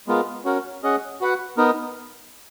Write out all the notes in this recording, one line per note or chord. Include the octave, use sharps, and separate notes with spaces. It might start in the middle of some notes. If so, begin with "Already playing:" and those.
G#3 B3 F4 A#4
C#4 F#4 A#4
C#4 G#4 D#5 F#5
F#4 B4 F#5
B3 D#4 A#4